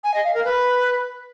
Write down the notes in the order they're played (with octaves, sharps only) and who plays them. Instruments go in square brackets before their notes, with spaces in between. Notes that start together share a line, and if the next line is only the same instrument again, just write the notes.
[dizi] G#5
D#5
F5
A#4
B4